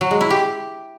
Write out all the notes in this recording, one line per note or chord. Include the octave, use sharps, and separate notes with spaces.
F#3
G#3
E4
G4